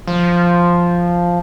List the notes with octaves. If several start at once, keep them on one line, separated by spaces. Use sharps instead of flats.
F3